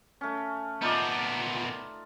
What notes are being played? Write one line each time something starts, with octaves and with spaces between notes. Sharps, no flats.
A3 C#4
A#2 B3 D#4 F4 D5